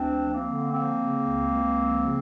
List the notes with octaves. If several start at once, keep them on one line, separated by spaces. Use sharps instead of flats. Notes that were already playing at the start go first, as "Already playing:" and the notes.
Already playing: D2 C4 D4
F3
A#3 C4
D3
F3 A#3 C4
C#3
C#2
C#2
F3
C#3